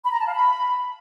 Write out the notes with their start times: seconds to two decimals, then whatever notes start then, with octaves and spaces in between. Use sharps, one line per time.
0.04 B5
0.12 A#5
0.19 A5
0.27 F5
0.34 B5